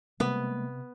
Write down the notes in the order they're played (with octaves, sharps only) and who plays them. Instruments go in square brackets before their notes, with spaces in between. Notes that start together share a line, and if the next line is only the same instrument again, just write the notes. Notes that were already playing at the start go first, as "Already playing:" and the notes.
[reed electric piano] C3 [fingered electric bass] G3 G#3 A#3 [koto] B3